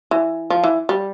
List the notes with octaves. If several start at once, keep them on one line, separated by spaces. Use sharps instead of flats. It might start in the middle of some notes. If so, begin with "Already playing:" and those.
E3
F3
E3
G3